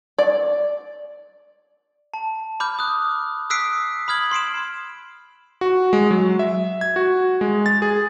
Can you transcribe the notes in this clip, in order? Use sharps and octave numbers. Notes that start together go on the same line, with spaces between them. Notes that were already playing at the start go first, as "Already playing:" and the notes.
D5
A5
B5 D6 F6 G6
D#6 F#6
D#6 E6 F#6 B6 C7 D7
B5 D#6 F6 G#6 F#7
C6 C7 D7 E7
F#4
G#3
F#3
E5
G#6
F#4
G#3
A6
G#4